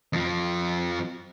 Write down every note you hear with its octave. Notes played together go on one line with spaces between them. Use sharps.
F2 F3